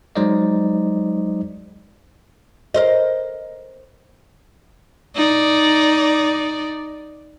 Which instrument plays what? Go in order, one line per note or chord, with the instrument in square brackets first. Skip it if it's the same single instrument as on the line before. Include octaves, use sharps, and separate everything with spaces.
[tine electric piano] F#3 G#3 D#4 C5 D5 D#5
[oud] A#4 C5 D#5
[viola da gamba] D#4 D5